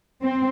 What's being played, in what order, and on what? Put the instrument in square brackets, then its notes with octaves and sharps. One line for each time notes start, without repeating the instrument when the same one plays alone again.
[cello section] C4